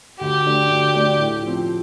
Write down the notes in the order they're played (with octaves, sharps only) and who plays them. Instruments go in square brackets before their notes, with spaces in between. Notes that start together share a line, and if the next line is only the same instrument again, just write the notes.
[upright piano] D2 [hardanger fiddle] G4
[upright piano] D3 A3 D4
D2
D3 A3 D4
A2
F3 C4